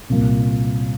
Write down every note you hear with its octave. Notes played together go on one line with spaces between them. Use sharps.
C2 A#2 G3 A#3